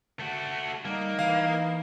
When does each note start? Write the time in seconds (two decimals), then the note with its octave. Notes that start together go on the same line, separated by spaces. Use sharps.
0.20 A3 F#4
0.85 G3 A#3 D#4
1.19 E3 B4 F5